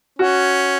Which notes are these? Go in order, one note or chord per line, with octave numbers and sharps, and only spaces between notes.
C#4 F#4